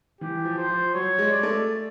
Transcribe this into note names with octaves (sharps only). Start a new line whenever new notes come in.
E3 G4
F3
C5
F3
F#3 C#5
G#3
D5
A3